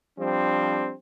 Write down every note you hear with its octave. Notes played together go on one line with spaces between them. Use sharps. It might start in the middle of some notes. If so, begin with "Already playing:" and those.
F3 G3 C4 D4